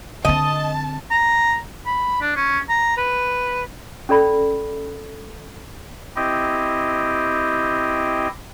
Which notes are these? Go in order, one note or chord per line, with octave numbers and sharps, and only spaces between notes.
D3 C4 D#5 A5
A#5
B5
D4
C#4
A#5
B4
C#4 A4 D5 B5
C4 E4 G4 D#5